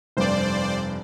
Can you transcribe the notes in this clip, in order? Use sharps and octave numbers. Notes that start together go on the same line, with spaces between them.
F1 G2 C5 D5